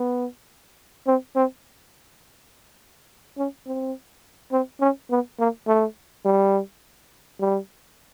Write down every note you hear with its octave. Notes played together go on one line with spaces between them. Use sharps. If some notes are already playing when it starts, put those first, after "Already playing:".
Already playing: B3
C4
C4
C#4
C4
C4
C#4
B3
A#3
A3
G3
G3